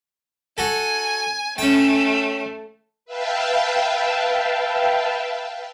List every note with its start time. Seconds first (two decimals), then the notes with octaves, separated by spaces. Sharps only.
0.58 F#4 A4 G#5
1.58 A3 C#4 G5
3.05 B4 E5 F5 G5 A5